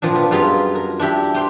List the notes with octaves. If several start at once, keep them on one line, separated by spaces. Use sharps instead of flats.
A#2 F3 C4 D4
B3
F#2 G3 B3 F4 G#4
A#4
D4 E4 G4 E5
G4 C5 G5